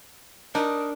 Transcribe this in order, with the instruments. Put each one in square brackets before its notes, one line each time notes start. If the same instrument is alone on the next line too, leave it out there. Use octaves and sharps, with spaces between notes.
[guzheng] D4 [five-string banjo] D#4 [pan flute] A#4